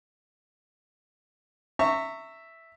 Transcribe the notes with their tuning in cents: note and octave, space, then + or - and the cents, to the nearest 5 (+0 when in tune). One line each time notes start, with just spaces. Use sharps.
E5 +0 A#5 -35 C#6 +0